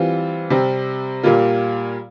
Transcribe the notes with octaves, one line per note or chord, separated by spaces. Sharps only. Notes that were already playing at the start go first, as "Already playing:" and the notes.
Already playing: E3 G3 C4 F4
C3 G3 C4
A#2 G3 A#3 F4